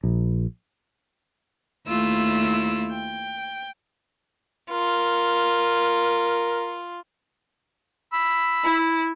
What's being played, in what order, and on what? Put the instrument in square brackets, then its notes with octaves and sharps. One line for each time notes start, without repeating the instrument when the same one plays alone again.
[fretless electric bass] A#1
[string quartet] D#2 A3 E4 F4 E6
G5
[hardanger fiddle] F4 [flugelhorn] A#4
[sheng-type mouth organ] B5 E6
[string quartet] E4